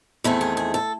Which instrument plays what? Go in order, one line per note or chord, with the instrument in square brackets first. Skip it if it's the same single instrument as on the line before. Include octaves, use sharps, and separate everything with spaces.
[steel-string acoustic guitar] E2 D#3 A3 C4 E4
G#4
G#4
A4